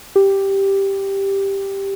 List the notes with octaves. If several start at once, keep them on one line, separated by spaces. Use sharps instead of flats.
G4